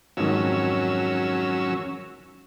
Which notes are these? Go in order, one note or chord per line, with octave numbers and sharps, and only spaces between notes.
F2 G#2 D#3 F#3 C#4 E6